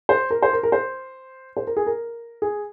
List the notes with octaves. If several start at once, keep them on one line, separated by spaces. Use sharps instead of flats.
C5
A#4
C5
A#4
A#4
C5
C5
A#4
G#4
A#4
G#4